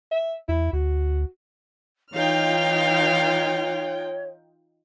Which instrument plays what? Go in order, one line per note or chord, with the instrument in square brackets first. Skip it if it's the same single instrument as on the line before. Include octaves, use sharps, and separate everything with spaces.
[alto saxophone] E5
[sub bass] E2 [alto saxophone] E4
[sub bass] D2 [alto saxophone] F#4
[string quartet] E3 F5 F6 [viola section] D#4 F4 G5 [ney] C#5